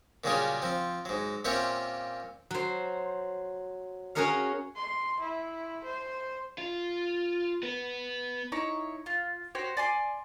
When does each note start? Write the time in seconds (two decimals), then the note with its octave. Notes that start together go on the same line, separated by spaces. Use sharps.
0.24 A#2 C#3 F#3 G3 C#4 G#4
0.62 F3 C4
1.05 G#2 F#3
1.45 A#2 C4 C#4 G4 E5 F#5
2.51 F#3 C5
4.15 C#4 F#4 G#4 A#4 C#5 F5
4.76 C6
5.20 E4
5.85 C5
6.58 F4
7.63 B3
8.52 D#4 E4 C#5
9.06 F4
9.55 F#4 G4 C5 C#5
9.77 D5 G#5 C6